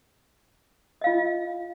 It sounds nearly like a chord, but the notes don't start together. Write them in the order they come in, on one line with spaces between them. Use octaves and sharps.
D#5 F5 F4